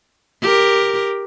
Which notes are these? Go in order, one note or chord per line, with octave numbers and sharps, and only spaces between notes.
G4 A#4